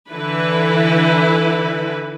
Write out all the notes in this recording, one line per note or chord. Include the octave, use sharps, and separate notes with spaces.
D3 E3 E4 B4